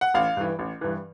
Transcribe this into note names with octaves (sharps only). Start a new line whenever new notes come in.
F#5
A1 F5
G2 E3
A1
G2 E3